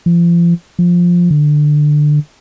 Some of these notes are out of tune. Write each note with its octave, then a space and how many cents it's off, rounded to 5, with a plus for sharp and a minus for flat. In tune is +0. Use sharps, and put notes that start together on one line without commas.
F3 -35
F3 +5
D3 +15